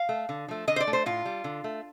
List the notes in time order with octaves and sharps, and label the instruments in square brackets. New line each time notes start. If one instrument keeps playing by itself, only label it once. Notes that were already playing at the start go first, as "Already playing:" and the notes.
Already playing: [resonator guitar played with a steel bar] F5
A3
D3
F3 A3
D3 D#5
C5
D5
A3
C5
A2 F4
G3
D3
A3